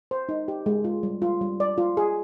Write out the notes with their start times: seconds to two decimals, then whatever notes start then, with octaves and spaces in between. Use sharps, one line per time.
0.11 C5
0.29 D#4
0.48 G4
0.66 G#3
0.84 F4
1.03 G3
1.22 F4
1.41 G3
1.60 D5
1.78 F4
1.97 G#4